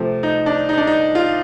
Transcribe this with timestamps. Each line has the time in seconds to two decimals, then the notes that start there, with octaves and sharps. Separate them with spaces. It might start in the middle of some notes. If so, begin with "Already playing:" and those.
Already playing: C3 F3 A3
0.23 D#4
0.46 D4
0.69 D#4
0.78 D4
0.87 D#4
1.15 F4